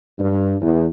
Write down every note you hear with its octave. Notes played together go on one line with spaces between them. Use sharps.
G2
E2